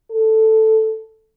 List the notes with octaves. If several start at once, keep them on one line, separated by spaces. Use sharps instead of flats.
A4